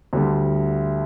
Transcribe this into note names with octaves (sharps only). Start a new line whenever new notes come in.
D2 D3 G3